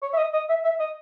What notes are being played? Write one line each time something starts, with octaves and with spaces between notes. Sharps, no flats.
C#5
E5
D#5
D#5
E5
E5
D#5